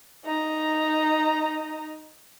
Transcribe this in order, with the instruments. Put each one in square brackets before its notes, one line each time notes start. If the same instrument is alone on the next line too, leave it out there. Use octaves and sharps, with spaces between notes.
[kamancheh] D#4 A#5